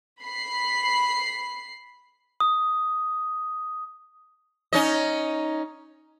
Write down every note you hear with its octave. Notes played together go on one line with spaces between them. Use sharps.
B5 C7
D#6
C#4 D#4 D#5